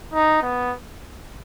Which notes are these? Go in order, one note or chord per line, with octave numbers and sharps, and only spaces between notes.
D#4
B3